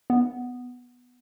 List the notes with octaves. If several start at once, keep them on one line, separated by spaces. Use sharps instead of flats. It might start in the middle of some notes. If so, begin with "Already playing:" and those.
B3